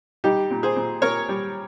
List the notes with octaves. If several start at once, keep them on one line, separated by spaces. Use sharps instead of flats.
G3 D#4 G4
A#2
G#4 C5
A#2
A#2 A#4 C#5
G3